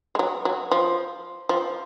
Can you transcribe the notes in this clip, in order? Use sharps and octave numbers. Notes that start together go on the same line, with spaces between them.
G#3
F#3
F#3
F3
F3